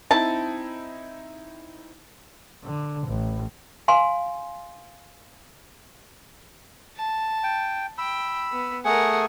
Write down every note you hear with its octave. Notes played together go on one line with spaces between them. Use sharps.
C4 D#4 E4 A5
D3
A1
F5 G#5 C6
A5
G5
G5 B5 E6
B3
A3 G#4 A#4 F#5 G#5